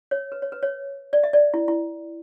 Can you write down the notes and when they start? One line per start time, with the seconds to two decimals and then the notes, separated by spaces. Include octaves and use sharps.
0.11 C#5
0.32 B4
0.42 C#5
0.52 B4
0.63 C#5
1.13 D5
1.24 E5
1.33 D5
1.54 E4
1.68 E4